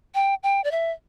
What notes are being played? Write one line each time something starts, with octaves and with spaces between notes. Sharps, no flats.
G5
G5
D5
E5